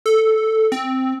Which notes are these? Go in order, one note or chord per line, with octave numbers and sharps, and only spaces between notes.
A4
C4